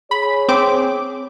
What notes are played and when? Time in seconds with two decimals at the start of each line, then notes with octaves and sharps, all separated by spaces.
0.11 G#4 C#5 B5
0.49 C4 D6